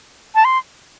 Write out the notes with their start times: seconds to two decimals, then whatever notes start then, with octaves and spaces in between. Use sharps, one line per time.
0.35 A5
0.45 C6